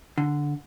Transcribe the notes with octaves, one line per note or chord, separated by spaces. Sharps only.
D3